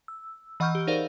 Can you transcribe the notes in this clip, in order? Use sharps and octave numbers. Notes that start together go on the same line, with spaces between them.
E6
E3 D#5 F#5 C#6 F6 G6
G4
D#4 G#4 A#4 C5 D5 F5